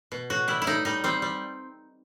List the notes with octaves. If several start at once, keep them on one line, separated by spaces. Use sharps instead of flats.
B2
A2 F#4
G3 E4
E4
A2 D#4
G3 D#4
G3 C4
G3